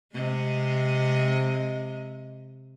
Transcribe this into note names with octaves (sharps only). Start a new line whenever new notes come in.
C3 G#3 D#5